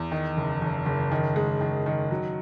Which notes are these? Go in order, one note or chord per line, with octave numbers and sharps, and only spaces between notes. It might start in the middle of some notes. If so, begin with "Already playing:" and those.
Already playing: E2
D#3
F#1
F#1
F#1
D#3
G#3
D#3
D#3
F#3